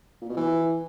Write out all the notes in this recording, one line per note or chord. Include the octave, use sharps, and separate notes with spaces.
A#2
B2
E3